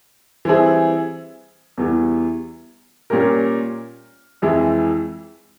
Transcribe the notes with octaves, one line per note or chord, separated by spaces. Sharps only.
E3 G3 C4 E4 G#4
E2 E3 G3
A#2 G3 C#4 G4 A#4
F2 E3 G#3 E4